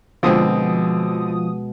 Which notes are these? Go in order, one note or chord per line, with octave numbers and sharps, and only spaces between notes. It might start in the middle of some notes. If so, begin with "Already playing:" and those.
B2 D3 F3 G#3 C4 D#6